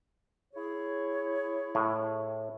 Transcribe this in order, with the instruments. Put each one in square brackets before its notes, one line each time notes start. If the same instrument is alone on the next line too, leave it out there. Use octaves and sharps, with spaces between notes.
[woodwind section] E4 G#4 C#5
[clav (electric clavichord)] A2